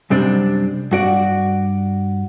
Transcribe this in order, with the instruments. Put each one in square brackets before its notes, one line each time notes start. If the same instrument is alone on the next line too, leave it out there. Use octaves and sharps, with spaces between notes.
[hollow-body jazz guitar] F#2 C3 G3 C4 D4
G2 F#4 D5